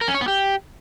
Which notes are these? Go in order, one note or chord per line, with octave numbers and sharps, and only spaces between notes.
A#4
C#4
C#5
B3
G4